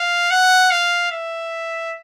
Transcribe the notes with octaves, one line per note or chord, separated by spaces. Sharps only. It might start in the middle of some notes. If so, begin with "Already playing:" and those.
Already playing: F5
F#5
F5
E5